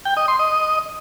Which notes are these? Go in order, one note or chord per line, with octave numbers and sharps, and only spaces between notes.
G5
D#5
C6
D#5